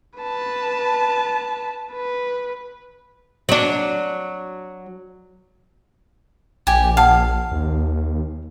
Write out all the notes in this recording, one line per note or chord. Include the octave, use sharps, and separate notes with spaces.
B4 A5
B4
F#3 D4
A#1 G4 G#5
F5 F#5 A5
D#2